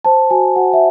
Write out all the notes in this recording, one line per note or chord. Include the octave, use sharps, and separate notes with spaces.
C5 A5
F#4 G#5
F#4 F#5
E5